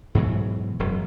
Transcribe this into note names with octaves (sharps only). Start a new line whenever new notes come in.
G#2 B2 E3 F#3
E1 F#2